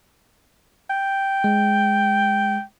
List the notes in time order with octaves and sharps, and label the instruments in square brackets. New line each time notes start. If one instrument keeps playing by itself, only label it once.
[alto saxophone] G5
[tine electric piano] G#3